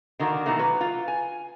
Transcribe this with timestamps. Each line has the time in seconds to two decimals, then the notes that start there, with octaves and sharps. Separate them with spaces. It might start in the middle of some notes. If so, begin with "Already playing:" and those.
0.19 D3 D#3 A#3 F#4
0.46 B2 D#3 E3 A3 A#3
0.59 F#3 B4
0.81 F4
1.08 G#5